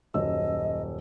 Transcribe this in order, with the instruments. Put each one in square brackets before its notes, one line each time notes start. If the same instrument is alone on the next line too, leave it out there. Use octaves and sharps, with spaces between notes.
[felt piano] D#1 F#2 E6 [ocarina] D#5